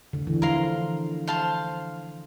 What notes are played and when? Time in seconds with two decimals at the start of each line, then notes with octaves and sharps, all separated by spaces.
0.13 D3
0.27 E3
0.42 F3 A#4 F5 C6
1.27 C5 F5 A5 C6